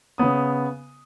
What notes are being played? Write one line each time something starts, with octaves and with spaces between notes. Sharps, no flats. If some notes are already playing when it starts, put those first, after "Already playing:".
C#3 B3 D#6